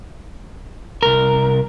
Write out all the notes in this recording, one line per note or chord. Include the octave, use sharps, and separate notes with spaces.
C2 A#4